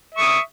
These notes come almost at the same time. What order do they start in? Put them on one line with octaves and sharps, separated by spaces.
E5 C#6 D#6